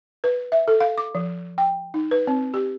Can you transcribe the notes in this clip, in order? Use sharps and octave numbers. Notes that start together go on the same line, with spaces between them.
B4
E5
A4
F5
D6
F3
G5
D#4
B4
C4
G4